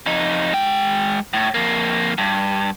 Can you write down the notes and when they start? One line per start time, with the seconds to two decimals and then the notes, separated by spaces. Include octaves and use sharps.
0.06 F2 D#4
0.53 G#3 G5
1.33 A2
1.54 F2 A#3
2.18 G2